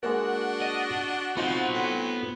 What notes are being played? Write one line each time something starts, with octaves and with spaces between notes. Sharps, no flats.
G#3 A#3 D4 F#4 A#4
D#5
F3 B3 C4 D#4 F4 C6
A2